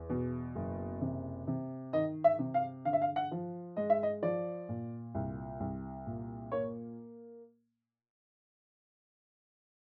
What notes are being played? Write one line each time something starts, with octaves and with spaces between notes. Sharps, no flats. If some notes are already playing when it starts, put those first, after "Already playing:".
Already playing: E2
B2
F#1
C3
C3
D#3 D#5
E5
C3
F5
D3 F5
E5
F5
F#5
F3
G#3 D#5
E5
D#5
F3 D5
A#2
C2
C2
A#2
A#3 C#5